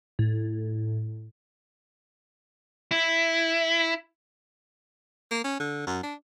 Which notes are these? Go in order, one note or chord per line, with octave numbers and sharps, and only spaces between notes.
A2
E4
A#3
C#4
D3
F#2
D4